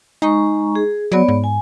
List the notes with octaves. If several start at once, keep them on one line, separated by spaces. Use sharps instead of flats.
G#3 D#4 A#5 C#6
G#4
F#3 B3 C#5 D5
G#2
G#5